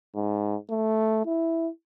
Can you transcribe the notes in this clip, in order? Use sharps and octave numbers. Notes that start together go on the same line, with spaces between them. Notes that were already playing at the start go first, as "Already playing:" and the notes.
G#2
A3
E4